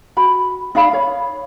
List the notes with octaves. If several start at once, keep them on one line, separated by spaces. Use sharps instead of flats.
F#4 B5
D#4 D5 F5 B5
C#5 F5